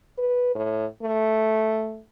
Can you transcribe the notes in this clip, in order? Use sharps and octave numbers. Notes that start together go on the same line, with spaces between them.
B4
A2
A3